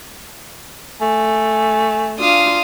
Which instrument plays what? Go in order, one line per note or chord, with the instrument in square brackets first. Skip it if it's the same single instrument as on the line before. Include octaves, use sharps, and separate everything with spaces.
[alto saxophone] A3 [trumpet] G#5
[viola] D4 F4 [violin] F5 D#6